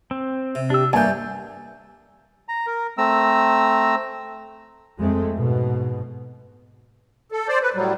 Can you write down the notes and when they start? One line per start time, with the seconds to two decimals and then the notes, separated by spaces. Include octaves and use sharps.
0.11 C4
0.55 C3
0.70 D4 G4 E6
0.93 G2 A3 A#3 D5 G#5 G6
2.48 A#5
2.67 A#4
2.98 A3 C4 A#5 E6
4.99 F2 G#3 A3 C4
5.35 G#2 B2
7.32 A4
7.48 C5 D5
7.62 B4
7.74 A2 F#3 G3